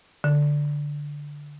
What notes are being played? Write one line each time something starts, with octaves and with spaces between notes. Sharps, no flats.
D3